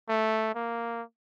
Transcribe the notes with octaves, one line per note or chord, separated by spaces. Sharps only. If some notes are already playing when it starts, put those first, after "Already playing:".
A3
A#3